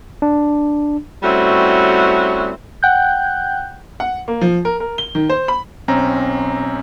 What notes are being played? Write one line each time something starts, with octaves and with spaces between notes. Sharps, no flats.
D4
G3 A3 C4 C#4 E4 F#4
F#5 G5 F#6 G6
F#5
A#3
F3
A#4
A#4
G7
D#3
C5
B5
B1 C4 C#4 A#5